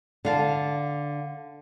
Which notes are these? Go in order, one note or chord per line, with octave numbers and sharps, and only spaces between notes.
D3 F5 A5